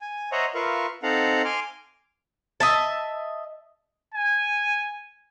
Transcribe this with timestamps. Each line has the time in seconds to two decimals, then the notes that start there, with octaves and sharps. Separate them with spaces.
0.01 G#5
0.32 C5 C#5 D#5 E5 F#5 A#5
0.54 F4 A#4 B4 E5 F5 C#6
1.03 C4 D#4 A4 F5 F#5 A#5
1.45 G#5 C6 D6 F6
2.60 D#5 E5 A5
4.14 G#5